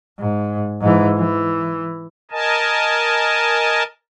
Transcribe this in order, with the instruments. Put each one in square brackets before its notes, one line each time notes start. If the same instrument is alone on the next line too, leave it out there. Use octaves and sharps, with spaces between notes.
[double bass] G#2
G#2 E3
E3
[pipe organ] A#4 D#5 G#5 A5